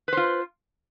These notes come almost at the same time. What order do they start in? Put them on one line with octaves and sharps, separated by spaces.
B4 C5 F4